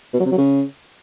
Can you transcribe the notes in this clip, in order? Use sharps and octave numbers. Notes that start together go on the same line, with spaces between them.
B2
F#3
C3
F#3
C#3